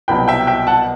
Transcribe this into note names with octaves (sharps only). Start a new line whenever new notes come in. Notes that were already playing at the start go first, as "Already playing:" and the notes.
C2 B2 F#3 G5 B5
E5 G5
E5 G5
F#5 A5